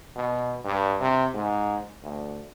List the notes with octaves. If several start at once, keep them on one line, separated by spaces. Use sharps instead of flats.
B2
G2
C3
G#2
D2